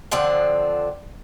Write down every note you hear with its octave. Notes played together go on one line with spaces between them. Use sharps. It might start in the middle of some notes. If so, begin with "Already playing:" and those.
D3 F3 C4 F#5